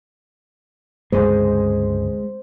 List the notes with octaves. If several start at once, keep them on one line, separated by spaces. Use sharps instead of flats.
C#2 G2 D3 G#3 C5